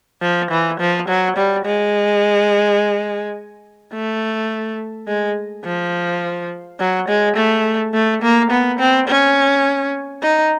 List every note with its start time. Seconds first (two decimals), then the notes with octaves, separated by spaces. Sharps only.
0.22 F3
0.51 E3
0.79 F3
1.08 F#3
1.36 G3
1.65 G#3
3.93 A3
5.07 G#3
5.65 F3
6.79 F#3
7.08 G#3
7.36 A3
7.94 A3
8.22 A#3
8.50 B3
8.79 C4
9.08 C#4
10.22 D#4